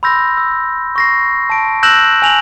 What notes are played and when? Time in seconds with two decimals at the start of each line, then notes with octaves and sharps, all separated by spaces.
0.03 B5 C6 E6 G6 A#6
0.37 E6
0.96 C#6 A#6 C7
1.50 A5 D7
1.83 E6 F#6 G6 A#6 E7 F#7
2.22 G#5 F7 F#7